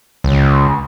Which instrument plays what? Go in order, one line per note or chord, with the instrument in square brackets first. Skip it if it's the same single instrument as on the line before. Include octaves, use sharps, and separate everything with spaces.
[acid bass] C#2